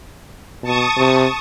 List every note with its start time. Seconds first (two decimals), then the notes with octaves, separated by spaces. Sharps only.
0.63 B2 A5 C#6 D#6
0.97 C3